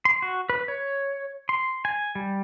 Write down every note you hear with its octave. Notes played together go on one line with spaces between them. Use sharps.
C6
F#4
B4
C#5
C6
G#5
G3